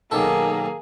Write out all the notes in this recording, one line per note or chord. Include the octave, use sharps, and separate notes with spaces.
B1 D#3 A#3 G#4 A4